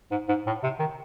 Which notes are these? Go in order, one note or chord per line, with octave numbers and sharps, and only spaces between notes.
G#2
G#2
A2
C3
D#3